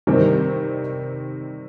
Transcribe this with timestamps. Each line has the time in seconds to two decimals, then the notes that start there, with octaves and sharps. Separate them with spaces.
0.07 C3 D#3 G3 C4